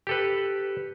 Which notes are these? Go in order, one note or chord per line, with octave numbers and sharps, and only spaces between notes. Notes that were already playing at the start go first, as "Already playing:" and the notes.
G4 A4 B4